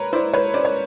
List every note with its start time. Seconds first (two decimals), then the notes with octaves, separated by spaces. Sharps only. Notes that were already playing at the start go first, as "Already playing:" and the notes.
Already playing: A#4 B4 C#5
0.13 E4 C5 D5
0.33 B4 C#5
0.54 C#4 C5 D5
0.65 C#5